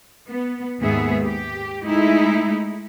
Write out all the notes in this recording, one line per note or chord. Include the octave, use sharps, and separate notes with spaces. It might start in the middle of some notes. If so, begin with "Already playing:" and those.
B3
D#2 G#2 B3 G#4 E5
G4
G#3 A3 D#4 E4